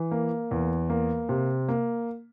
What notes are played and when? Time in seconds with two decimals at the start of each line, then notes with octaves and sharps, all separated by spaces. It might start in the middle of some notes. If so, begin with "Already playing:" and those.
Already playing: E3
0.11 A#3
0.51 E2
0.90 A#3
1.29 C3
1.68 A#3